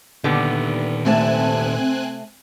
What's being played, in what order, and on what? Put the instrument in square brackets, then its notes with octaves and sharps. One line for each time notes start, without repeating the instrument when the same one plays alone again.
[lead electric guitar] A#2 D#3 [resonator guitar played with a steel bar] D3 G3 B3
[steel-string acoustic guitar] C3 A3 A5 [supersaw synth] C4 G#5 F#6